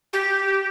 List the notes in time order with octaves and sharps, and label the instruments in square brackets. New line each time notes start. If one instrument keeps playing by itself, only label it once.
[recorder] G4